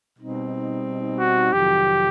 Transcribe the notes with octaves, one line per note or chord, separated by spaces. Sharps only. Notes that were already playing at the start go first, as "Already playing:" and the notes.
B2 G3 C4 D#4
F#4
F2 C3 D#3 F#3 G4